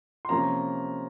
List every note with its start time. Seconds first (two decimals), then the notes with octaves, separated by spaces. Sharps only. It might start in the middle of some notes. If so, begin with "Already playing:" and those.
0.25 C6
0.29 C3 F3 A#3 C#4 A#5